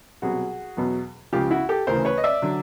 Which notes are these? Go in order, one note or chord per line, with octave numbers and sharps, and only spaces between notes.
C2 B2 F#3 F#4 G#4
E2 B2 F#3
C#2 C#3 F3 F4 G4
E4 F#4
G4 A4
D2 C#3 E3 A#4 C5
B4 C#5
D#5
D5 E5
D3 F#3